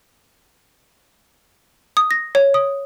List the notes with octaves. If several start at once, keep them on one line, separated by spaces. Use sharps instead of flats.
D#6
A#6
C#5
D#6